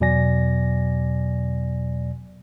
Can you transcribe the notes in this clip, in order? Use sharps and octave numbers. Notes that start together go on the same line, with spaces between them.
E2 B2 F#3 D5 G#5 A#6